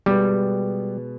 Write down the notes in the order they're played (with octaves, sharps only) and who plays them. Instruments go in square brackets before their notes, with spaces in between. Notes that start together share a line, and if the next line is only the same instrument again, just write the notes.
[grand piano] B2 G#3 B3 [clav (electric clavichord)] G3